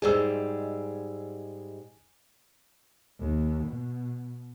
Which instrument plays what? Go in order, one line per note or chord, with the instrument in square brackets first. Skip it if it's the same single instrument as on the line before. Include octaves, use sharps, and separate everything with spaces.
[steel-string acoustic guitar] G#2 G3 G#3 [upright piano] G#4 E6
[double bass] D#2
B2